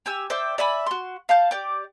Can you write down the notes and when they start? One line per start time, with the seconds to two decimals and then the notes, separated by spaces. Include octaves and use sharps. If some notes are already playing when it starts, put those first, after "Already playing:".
0.06 G4 G#5 E6
0.30 C5 D5 E5 G5
0.58 D5 E5 G#5 B5
0.86 F#4 C6
1.29 F5 A5 G6
1.51 G4 D5